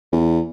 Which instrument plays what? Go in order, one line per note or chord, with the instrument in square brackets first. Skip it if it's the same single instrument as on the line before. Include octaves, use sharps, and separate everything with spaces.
[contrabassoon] E2